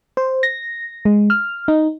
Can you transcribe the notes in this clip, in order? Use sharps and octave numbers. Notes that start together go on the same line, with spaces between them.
C5
A#6
G#3
F6
D#4